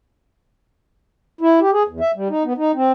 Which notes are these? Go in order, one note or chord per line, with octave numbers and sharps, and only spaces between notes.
E4
G4
G#4
E2
E5
G3
D#4
B3
D#4
C4